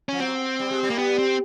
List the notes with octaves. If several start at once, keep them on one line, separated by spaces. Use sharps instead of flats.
F3 C#4
F#3 C4
G3
G#3
G3
A#3
B3
C4